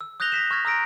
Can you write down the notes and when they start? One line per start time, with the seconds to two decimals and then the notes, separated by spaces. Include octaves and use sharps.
0.01 E6
0.20 D#6 F#6 G6 A#6 F7 G7
0.32 A#6 B6 E7
0.51 C#6 F6 G#6 A#6
0.65 A#5 D#6 E6 A#6 D7